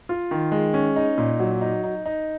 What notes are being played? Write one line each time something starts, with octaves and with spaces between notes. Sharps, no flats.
F4
D#3
G#3
C#4
D#4
A#2
F#3
D#4
D#4
D#4